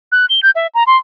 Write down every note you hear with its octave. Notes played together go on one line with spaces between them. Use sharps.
F#6
G7
G6
E5
A#5
C6